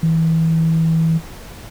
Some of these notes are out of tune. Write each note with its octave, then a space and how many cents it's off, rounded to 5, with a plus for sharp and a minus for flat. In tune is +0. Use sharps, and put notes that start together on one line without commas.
E3 -25